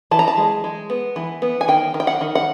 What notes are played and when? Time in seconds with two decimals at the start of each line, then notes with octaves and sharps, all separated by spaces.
0.11 E3 A5
0.19 A#5
0.28 A5
0.37 G#3
0.64 G#3
0.90 B3
1.16 E3
1.42 B3
1.61 G#5
1.68 D#3 G5
1.94 D#3
2.00 G5
2.07 F#5
2.21 D#3
2.35 F#5